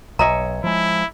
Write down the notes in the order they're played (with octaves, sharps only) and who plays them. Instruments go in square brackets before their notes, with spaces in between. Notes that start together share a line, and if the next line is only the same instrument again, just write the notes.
[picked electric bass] B1 [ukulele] C#5 D#5 E5 [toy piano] A#5
[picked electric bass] F3 G#3 [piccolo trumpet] E4